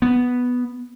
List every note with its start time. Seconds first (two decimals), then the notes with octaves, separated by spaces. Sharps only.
0.02 B3